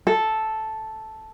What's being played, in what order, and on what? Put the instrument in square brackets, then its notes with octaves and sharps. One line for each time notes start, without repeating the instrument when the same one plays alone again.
[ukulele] A4